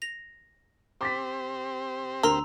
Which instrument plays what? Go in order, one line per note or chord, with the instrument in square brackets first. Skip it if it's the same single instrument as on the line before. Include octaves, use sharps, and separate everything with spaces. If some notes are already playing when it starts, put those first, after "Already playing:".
[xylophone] A#6 F7
[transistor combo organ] C4 G4 C5 [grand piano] D6 A6 B6
[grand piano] D2 [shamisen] A#4 [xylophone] A#5 C6 E6